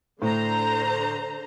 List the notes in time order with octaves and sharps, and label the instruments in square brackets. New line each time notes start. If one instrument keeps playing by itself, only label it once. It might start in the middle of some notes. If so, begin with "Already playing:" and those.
[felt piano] A2 [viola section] D3 C5 A#5